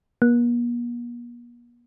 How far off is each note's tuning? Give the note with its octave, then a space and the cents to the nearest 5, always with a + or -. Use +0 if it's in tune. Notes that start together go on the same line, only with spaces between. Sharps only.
A#3 +45